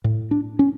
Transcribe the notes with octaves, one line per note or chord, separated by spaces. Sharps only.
A2
D4
C#4